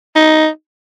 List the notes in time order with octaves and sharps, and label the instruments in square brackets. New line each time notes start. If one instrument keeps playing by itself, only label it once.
[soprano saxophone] D#4